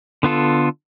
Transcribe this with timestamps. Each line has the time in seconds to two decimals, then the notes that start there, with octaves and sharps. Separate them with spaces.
0.23 D3 B3 F4 A4